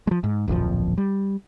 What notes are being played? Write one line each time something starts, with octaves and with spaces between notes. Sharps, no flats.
F3 G#3
G#2
D1 A#1 F2 F3
G3